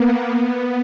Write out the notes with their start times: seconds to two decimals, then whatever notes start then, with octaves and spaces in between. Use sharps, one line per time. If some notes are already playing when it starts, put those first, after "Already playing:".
Already playing: A#3 B3
0.25 B3